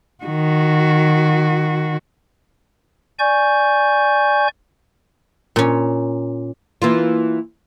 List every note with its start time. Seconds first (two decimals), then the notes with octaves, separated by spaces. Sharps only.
0.24 D#3 F#4
3.19 D5 G#5 C#6 G6
5.56 A#2 C#4
6.82 E3 A#3 F4